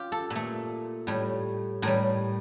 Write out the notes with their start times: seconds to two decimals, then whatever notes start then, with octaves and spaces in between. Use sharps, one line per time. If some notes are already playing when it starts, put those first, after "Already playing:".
Already playing: F4 G4
0.12 A4
0.30 A#2
0.35 A3
1.07 A2 G3
1.82 A2 G3 A#4